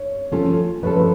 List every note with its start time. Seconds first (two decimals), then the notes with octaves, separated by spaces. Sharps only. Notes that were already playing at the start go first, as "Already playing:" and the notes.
Already playing: C#5
0.32 F3 A3 C#4 F4 A4
0.83 F3 A3 C#4 F4 A4 B4
0.96 B4